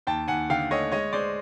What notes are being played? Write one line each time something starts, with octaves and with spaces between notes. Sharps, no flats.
D#2 G5 A5
D#2 F#5 G#5
D3 F5 G5
A3 C#5 D#5
G#3 C#5 D#5
G#3 C5 D5